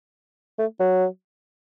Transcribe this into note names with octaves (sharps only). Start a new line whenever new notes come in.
A3
F#3